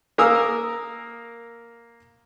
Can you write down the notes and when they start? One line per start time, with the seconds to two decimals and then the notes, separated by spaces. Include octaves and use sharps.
0.18 A#3 A#4 D#6 E6